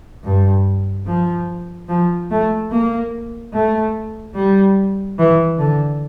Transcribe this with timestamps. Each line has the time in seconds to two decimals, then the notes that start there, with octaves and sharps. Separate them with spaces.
0.24 G2
1.06 F3
1.88 F3
2.30 A3
2.71 A#3
3.53 A3
4.35 G3
5.19 E3
5.59 D3